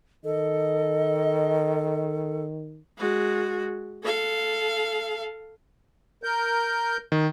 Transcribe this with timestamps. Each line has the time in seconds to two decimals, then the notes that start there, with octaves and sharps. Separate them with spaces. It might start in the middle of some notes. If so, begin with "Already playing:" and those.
0.24 D#3 A4 D#5
2.98 G#3 F#4
4.03 A4 F5
6.23 A#4 G6
7.12 D#3